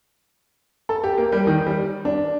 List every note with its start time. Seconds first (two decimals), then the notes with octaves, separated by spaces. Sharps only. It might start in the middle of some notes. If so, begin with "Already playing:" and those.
0.89 A4
1.04 G4
1.17 A#3
1.32 G3
1.47 D#3
1.66 G3
2.05 D4